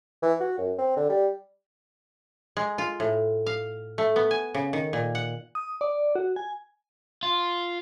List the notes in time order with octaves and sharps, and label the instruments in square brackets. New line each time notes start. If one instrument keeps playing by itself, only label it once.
[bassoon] E3
F#4
F#2
C4
D3
G3
[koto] G#3
F4
A2
F5
A3
B3
G#5
C#3
D#3
A#2
F#5
[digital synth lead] D#6
D5
F#4
G#5
[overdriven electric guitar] F4